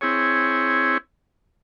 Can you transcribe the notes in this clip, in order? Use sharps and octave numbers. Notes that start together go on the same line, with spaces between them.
C4 E4 G#4 C#5